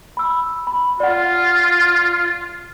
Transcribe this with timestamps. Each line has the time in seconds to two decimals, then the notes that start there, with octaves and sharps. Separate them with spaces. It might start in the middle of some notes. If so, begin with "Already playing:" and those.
0.17 B5 E6
0.67 B5
1.00 F4 D5 F#5